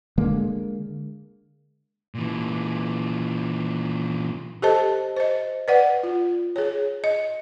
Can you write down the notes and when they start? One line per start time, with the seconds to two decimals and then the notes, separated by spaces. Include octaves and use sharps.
0.18 D3 G#3 A#3
2.15 A#2 E3
4.62 G4 A4 C5 D#5 A5
5.17 C5 D#5
5.68 B4 D5 F#5
6.03 F4
6.56 G#4 C#5
7.04 D#5